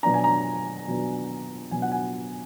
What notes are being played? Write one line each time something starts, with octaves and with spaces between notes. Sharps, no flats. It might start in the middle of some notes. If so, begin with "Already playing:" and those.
B2 F#3 B3 D4 A#5
G#5
A#5
B2 F#3 B3 D4
B2 F#3 B3 D4 G#5
F#5
G#5